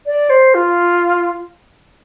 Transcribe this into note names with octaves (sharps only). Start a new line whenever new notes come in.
D5
C5
F4